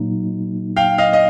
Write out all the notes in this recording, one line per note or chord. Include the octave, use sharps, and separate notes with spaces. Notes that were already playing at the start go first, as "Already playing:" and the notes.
Already playing: A#2 F#3 A#3 D#4
F5 G5
D#5 F5
D#5